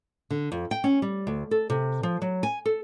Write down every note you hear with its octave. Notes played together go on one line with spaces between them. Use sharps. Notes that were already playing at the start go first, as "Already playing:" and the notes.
D3
F2
G5
C#4
G3
D2
A4
C3
F3
F#3
G#5
A4